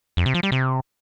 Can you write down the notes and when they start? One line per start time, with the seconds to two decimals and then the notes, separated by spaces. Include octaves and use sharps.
0.17 F2
0.26 C3
0.34 F3
0.43 G3
0.52 C3